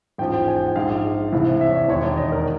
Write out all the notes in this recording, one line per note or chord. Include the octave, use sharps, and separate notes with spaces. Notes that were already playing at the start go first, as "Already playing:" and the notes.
A1 G#2 F3 G5
G5
G#5
G5
F#5
A#1 G#2 F3 F5
C2 C3 E3 F5
E5
C#5
D5
E1 D#2 D#3 C#5
D5
D#5
A#4